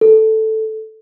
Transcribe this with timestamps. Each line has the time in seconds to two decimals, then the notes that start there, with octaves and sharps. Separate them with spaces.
0.01 A4